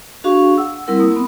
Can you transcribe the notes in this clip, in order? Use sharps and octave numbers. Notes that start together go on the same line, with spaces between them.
D4 F#4 G#4 F5 C#6
F#5 E6
G3 C4 E4 A#4 F#5 E6
A#3 D#6
B3 C4